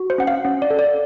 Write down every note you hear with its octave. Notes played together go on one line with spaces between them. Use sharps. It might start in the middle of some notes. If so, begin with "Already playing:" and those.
Already playing: F#4
C5
C#4 F#5
F5
C#4
D5
A4
D5